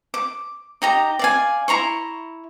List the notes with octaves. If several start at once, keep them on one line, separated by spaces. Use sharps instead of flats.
D6
D#4 G4 A#5
D5 F5 G#5
E4 A#5 C6 C#6